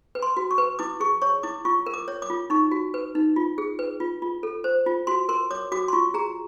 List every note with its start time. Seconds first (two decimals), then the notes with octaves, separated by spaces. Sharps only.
0.15 B4
0.22 C6
0.37 F#4
0.51 C#6
0.58 B4
0.79 E4 D6
1.00 G#4 C#6
1.22 C#5 C#6
1.43 E4 D6
1.65 F4 C#6
1.86 A#4
1.94 D6
2.08 C#5
2.22 D6
2.30 F4
2.50 D#4 C#6
2.72 F#4
2.94 B4
3.15 D#4
3.36 F4
3.58 G#4
3.79 B4
4.00 F4
4.22 F4
4.43 A4
4.64 C5
4.86 F4
5.07 F#4 C6
5.29 A#4 C6
5.51 C#5 D6
5.72 F#4 D6
5.88 C6
5.93 F4 C#6
6.14 G#4 A#5